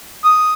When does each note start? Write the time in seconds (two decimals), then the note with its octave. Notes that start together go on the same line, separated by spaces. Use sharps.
0.25 D#6